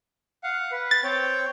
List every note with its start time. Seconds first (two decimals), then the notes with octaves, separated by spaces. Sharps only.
0.43 F5 F#5
0.72 B4
0.91 A6
1.04 C4 C#5 G5